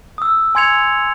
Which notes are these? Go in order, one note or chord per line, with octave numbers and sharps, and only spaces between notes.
D#6 E6
G#5 C6 G#6 C#7 F7